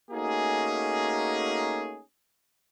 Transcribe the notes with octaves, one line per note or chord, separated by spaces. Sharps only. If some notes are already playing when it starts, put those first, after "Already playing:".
A3 A#3 C#4 D#4 F#4 G#4